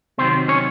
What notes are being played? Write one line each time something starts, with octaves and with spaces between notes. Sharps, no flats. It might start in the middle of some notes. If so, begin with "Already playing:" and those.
C3 D#3 F#3 C4 C5
C#4 C#5